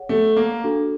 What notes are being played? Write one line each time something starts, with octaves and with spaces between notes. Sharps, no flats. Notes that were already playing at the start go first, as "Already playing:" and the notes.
Already playing: G#4 C#5 F#5
A3
A#3
D4 F#4 A4